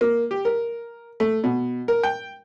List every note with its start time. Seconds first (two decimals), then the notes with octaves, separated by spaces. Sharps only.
0.01 A#3
0.31 G4
0.45 A#4
1.20 A3
1.44 B2
1.88 A#4
2.03 G5